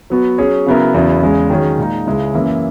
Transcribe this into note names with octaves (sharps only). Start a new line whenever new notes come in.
F#3 B3 F#4
F#3 C#4 G#4 C#5
C#3 F#3 B3 E4 A#4
E2 C#3 F#3 B3 E4
E2 C#3 G#3
D#3 F#3 C#4 G#4 C#5
A#2 G#3 D#4
C#2 C#3 G#3 C#4 E4
F#2 E3 A#3 E4